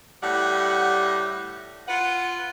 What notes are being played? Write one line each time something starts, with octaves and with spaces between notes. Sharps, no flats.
A2 G3 F#5
F4 B4 F#5